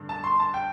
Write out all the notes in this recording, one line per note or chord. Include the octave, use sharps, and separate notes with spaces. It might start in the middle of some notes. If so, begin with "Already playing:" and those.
Already playing: G2 D3
A5
C6
A5
G5